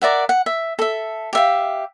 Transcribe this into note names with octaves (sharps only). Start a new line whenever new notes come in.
A#4 D5 E5 F#5
F#5
E5
A4 E5
G4 E5 F5